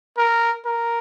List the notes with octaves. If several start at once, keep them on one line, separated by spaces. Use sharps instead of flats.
A#4
A#4